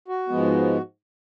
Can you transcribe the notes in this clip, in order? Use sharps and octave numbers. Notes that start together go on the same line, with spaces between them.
F#4
G#2 F3 G#3 B3